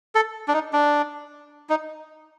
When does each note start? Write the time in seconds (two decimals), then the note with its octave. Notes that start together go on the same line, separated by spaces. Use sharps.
0.15 A4
0.48 D4
0.54 D#4
0.73 D4
1.70 D#4